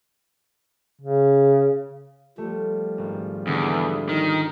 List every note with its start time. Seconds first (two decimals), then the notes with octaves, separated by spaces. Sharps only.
1.01 C#3
2.38 F3 G3 A3
2.98 G#1
3.47 E2 D3 D5 D7
4.09 D#3